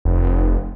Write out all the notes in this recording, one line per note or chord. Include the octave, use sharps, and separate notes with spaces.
F1